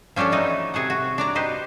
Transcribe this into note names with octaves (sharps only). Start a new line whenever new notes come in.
F3 C#4 D4 G4 A4
E3 F#3 A3 D#4
C3 G#4 A4 F#5
F#4
D4 D5 A#5
D#4 G4 B4 C5